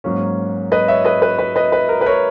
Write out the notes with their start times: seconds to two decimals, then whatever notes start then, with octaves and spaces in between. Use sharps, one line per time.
0.04 G#2 F#3 A#3 C#4
0.72 B4 D#5
0.88 C#5 E5
1.05 B4 D#5
1.22 B4
1.39 B4
1.56 B4 D#5
1.72 B4
1.89 A#4
2.01 B4
2.06 A#4 C#5